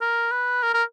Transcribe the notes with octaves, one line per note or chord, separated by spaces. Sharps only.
A#4
B4
A#4
A#4